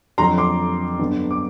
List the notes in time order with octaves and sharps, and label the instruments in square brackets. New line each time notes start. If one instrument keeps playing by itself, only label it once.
[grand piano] F2 D3 F#3 A#5 C6
C6 D6
G2 D3 F#3 B3
D6